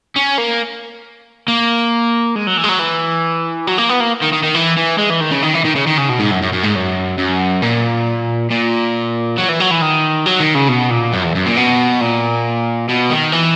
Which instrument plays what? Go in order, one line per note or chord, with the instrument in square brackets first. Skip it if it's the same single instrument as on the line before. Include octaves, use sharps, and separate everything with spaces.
[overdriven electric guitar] C#4
A#3
A#3
G#3
F#3
E3
G#3
F#3
E3
F#3
A#3
B3
A#3
D#3
D#3
D#3
E3
E3
G#3
E3
D#3
C#3
D#3
E3
D#3
C#3
D#3
C#3
B2
G#2
F#2
F#2
F#2
G#2
F#2
F#2
A#2
A#2
F#3
E3
F#3
E3
D#3
F#3
D#3
C#3
B2
A#2
F#2
E2
F#2
A#2
B2
A#2
B2
D#3
E3